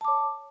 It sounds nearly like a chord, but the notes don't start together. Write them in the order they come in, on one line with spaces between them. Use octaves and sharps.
A5 D6 C#5